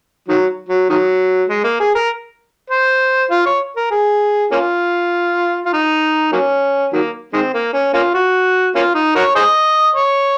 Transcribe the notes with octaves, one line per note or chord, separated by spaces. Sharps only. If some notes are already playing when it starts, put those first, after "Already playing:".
D#3 F#3
F#3
D#3 F#3
G#3
A#3
G#4
A#4
C5
F4
C#5
A#4
G#4
A#3 C#4 F4
F4
D#4
F#3 A#3 C#4
D#3 F#3 A#3
D#3 G#3 C4
A#3
C#4
A#3 C#4 F4
F#4
A#3 C#4 F4
D#4
F#4 A#4 C#5
G#4 C5 D#5
C#5